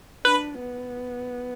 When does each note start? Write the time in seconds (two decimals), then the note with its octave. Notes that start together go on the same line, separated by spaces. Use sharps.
0.25 D4 B4
0.60 B3